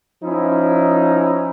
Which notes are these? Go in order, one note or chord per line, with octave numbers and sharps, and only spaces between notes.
F3 C#4 D#4 E4